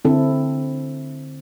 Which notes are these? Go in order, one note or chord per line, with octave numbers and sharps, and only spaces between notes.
D3 C4 E4 A4